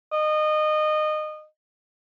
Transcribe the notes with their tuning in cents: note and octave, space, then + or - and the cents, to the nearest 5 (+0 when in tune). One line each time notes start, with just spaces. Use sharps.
D#5 -25